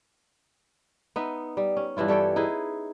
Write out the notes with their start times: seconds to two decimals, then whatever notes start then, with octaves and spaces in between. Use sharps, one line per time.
1.16 B3 D#4 D#5 E5
1.57 G3
1.77 C#4
1.97 G2 E3 E4 F4
2.08 G3 A4 C#5 G5
2.36 D#4 E4 G#4 B4